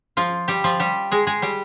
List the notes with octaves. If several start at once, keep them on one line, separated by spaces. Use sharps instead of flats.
F3 F4
G3 G4
F3 F4
G3 G4
G#3 G#4
G#3 G#4
G3 G4